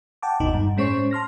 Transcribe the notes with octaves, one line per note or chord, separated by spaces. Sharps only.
F#5 G5 A5 D6
G1 D#2 B2 D#4
G2
A2 G#3 C#4 C5 C#6
A5 C6 F6 A#6